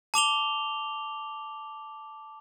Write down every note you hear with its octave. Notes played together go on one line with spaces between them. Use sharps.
A5 D6 F7 G7